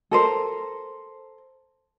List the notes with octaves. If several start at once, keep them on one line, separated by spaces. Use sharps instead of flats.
A4 A#4 C5